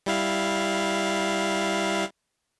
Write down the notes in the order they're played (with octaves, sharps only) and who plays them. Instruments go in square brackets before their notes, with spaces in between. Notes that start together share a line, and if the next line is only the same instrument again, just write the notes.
[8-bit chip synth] G3 E4 F5